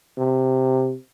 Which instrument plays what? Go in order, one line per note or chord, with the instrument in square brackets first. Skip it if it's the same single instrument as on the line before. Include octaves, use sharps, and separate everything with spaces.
[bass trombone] C3